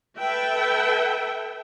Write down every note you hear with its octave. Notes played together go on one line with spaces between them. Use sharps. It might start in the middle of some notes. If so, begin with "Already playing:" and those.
A4 B4 E5 G5